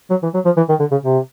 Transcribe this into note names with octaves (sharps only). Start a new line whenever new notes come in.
F#3
E3
F#3
F3
E3
D#3
D3
C#3
C3